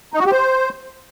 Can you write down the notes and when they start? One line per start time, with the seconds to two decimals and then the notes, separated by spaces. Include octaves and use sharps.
0.14 D#4
0.20 F#4
0.26 G4
0.32 C5